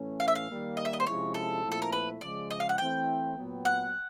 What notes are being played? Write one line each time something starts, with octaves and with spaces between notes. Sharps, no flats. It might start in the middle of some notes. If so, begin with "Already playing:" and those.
Already playing: A2 E3 A3 C#4
F5
E5
F5
D#3 G3 A#3
D#5
E5
D#5
C5
C3 F3 G#3 C#4 E4 C#5
A4
A#2 F3 A3 C4 E4
A4
A#4
B4
C#3 F3 G#3 D5
D#5
F5
F#5
E3 A3 C4 E4 G5
A#2 F#3 B3
F#5